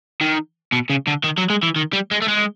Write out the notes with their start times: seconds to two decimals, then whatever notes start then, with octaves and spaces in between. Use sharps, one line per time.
0.21 D#3
0.72 B2
0.90 C#3
1.07 D3
1.24 D#3
1.38 F#3
1.50 G#3
1.63 E3
1.76 D#3
1.93 G3
2.11 G#3
2.22 A3
2.28 G#3